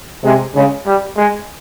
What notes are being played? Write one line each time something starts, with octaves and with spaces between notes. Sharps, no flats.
C3 G#3
C#3 G#3
G3
G#3